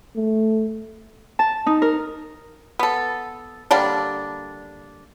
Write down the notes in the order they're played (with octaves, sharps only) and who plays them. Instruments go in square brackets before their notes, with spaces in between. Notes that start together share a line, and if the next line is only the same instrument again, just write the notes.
[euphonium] A3
[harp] A5
D#4
A#4
[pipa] B3 A4
D3 G3 A#3 D4